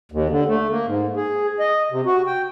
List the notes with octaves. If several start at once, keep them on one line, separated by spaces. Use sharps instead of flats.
D#2
D3
A3
A#3
G#2
G#4
D#5
C3
F#4
G5